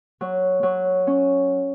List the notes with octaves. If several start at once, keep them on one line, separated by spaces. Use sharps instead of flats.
F#3
F#3
C#4